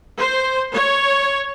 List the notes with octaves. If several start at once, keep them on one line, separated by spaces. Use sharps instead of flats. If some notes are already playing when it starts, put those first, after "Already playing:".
C5
C#5